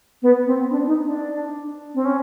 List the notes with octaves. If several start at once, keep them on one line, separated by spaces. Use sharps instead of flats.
B3
C4
D4
D#4
D4
C4
C#4